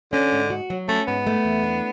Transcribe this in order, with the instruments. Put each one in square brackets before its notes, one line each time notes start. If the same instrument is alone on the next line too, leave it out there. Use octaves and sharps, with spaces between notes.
[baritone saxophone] D3 [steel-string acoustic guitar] C#4
[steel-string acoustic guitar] G#2
F#4
F#3
[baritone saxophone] A3 [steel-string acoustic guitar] C#4
[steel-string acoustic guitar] G#2 [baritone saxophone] B3
[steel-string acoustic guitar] A3
E2
D4